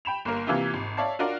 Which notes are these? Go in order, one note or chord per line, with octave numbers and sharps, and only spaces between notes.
G5 B5 E7 F7
G1 A#3 A#4
C3 E3 A#3 E4 F4 G4
G#1
C#5 D5 E5 F5 A5
D4 F4 F#4 A#4 D5